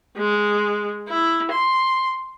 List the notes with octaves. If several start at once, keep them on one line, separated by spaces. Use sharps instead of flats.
G#3
E4
C6